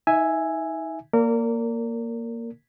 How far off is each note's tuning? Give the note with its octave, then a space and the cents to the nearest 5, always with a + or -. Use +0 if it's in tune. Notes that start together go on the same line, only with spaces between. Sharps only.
D#4 +35 E5 +0 G#5 +0
A#3 +0 A#4 -25 D5 -30